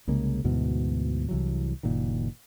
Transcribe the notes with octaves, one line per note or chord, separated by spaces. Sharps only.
C2 C#3 G#3 A#3
D2 G#2 B2 E3
C2 E3 F#3
F#1 A#2 D#3